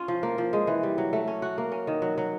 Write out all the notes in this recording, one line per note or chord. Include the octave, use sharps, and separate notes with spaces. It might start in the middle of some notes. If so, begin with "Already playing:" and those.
Already playing: C#4 F4
F3
A#3
F3
G#3
E3
G3
F#3
A3
C#4
F#4
A#3
C#4
D#3
F#3
F#3